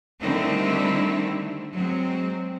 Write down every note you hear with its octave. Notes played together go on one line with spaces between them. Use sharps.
D3 D#3 G3 A3 C4 E4
F#3 G#3 C4